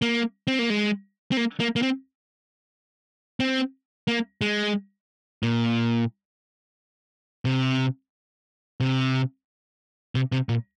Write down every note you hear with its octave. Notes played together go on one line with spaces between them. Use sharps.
A#3
C4
A#3
G#3
C4
A#3
A#3
A#3
C4
C4
A#3
G#3
A#2
C3
C3
C3
C3
A#2